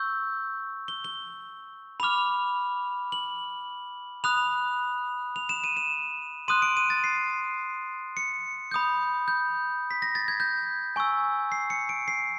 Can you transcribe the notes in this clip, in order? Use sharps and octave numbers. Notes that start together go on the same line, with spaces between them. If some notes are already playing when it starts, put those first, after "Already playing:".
Already playing: C#6 E6 G6
G7
G7
B5 D6 F6 F7
F#7
B5 D#6 F#6 F7
F7
E7
D#7
E7
C6 D#6 F#6 D#7
D7
D#7
A6
C7
C#7
B5 D#6 G6
G6
B6
A#6
A6
G#6
G6
G#5 C#6 E6
C7
C#7
D7
C7